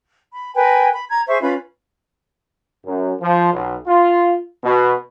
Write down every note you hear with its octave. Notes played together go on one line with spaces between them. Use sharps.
B5
A#4 B4 G5 G#5
B5
A#5 G#6
G#4 C5 E5 C#6
C#4 F4 B4 B5
F#2
F3
B1
F4
B2